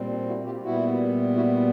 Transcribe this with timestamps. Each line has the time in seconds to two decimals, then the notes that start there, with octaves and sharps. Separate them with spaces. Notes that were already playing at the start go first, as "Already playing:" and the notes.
Already playing: A#2 G3 C4
0.09 D4
0.27 E4 F#4
0.45 F4 G4
0.63 A#2 G3 B3 E4 F#4
1.34 E4 F#4